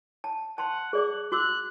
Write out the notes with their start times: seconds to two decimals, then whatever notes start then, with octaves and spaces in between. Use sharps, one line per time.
0.24 A5
0.58 F#5 A5 C6
0.93 G#4 D5 D6 F#6
1.32 F#4 D6 E6 F#6